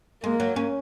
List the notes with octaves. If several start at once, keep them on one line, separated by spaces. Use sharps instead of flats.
G#3 A#3
F#3
C#4